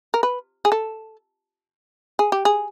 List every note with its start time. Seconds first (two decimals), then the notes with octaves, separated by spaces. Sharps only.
0.14 A#4
0.23 B4
0.65 G#4
0.72 A4
2.19 G#4
2.32 G4
2.45 G#4